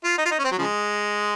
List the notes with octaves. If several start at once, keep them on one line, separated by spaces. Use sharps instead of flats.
F4
D#4
F4
D#4
C#4
C4
F#3
C#3 F3 G#3